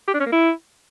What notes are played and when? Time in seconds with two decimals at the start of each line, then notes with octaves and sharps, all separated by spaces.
0.08 G4
0.14 D4
0.20 C#4
0.26 A#3
0.32 E4